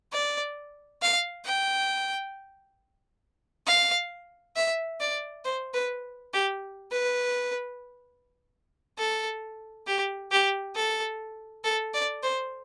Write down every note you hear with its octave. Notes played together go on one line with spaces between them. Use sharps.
D5
F5
G5
F5
E5
D5
C5
B4
G4
B4
A4
G4
G4
A4
A4
D5
C5